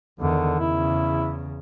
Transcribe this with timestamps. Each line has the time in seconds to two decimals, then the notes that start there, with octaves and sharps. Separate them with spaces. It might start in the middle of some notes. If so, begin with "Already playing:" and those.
0.20 E2 D3 D#3
0.59 E2 C#3 E4